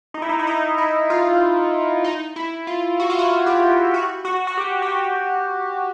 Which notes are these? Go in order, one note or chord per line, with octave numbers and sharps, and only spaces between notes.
D#4
E4
D#4
E4
D#4
E4
F4
D#4
E4
F4
F#4
F4
F#4
G4
F#4
F#4
F#4
G4
G4
F#4